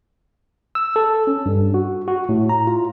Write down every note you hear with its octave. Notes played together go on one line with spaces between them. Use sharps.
E6
A4
C#4
G2
F#4
F#4
A2
A#5
F4